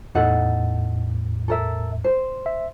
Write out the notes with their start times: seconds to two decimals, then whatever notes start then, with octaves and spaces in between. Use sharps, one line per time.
0.15 E2 A2 D#4 A4 F#5
1.48 A4 A#4 E5
2.04 C5
2.46 E5